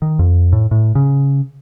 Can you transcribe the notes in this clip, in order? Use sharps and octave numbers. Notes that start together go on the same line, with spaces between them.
D#3
F2
A2
A2
C#3